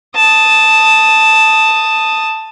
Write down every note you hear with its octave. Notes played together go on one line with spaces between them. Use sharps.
A5 D#6